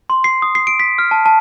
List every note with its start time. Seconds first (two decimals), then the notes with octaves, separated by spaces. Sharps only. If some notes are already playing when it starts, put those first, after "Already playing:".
0.10 C6
0.24 C7
0.42 D#6
0.55 C7
0.67 D7
0.80 B6
0.98 F6
1.11 A5
1.26 A5